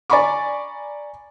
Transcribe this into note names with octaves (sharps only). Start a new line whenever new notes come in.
D5 G#5 A#5 B5 C#6 D6